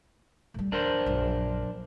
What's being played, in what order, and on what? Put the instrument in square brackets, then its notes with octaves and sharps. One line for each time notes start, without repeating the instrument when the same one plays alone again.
[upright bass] A2 G3
[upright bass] D#2 [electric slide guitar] D4 A#4 C5
[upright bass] A#1 F#2